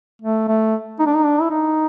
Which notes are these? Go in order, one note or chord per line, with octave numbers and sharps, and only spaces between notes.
A3
A3
D#4
D4
D#4
D4
E4
D#4